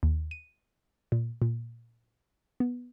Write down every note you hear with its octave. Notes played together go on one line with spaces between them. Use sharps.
D#2
D#7
A#2
A#2
B3